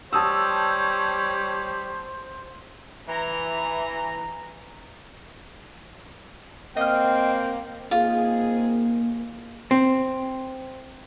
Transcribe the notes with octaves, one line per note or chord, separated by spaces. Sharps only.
G3 C5 C#5 A5 D#6 E6
E3 A#5
A#3 C4 D#5 G5 F6
A#3 C4 D#4 F4 G#4
C4